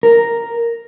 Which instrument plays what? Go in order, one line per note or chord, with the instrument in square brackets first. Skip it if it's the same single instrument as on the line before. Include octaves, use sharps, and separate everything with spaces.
[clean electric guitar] A#4